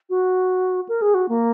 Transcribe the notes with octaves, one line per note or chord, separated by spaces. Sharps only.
F#4
A#4
G#4
F#4
A#3